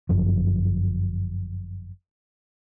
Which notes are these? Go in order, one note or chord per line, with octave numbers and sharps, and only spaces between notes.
G1 F#2 F3